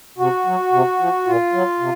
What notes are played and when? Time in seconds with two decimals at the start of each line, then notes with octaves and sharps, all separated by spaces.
0.18 C3 F#4
0.46 F#3
0.72 C3
0.99 F3
1.26 A#2 F4
1.53 F#3
1.80 C3